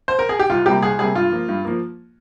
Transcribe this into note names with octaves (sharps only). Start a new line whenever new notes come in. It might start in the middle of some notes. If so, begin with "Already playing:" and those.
C5
A#4
G#4
G4
C2 F4
C3 G3 A#3 G4
C2 G#4
C3 G3 A#3 G#4
G2 F4
F3 A#3
G2
F3 A#3